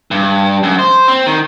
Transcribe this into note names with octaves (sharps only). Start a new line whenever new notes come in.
G2
F#2
C5
C4
D#3